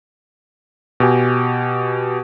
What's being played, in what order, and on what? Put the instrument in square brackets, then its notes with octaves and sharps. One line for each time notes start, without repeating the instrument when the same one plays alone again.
[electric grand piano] B2 G4 G#5